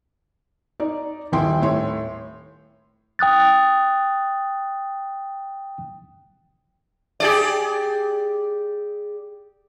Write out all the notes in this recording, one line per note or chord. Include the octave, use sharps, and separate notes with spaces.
D#4 D5
D#1 D#3 E4 G5 C6
A2 C#5 C6
G5 D#6 F#6 A6
G4 G#4 D5